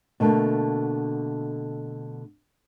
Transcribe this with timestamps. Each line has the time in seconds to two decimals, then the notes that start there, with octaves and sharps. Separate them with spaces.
0.20 B2 D3 A3 A#3